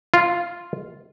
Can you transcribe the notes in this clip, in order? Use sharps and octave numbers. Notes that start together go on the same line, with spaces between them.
F4